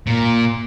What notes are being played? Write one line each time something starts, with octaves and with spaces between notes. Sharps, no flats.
A#2